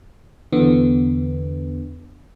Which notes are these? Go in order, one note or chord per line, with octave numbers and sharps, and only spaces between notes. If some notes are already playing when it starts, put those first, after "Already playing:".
E2 D3 B3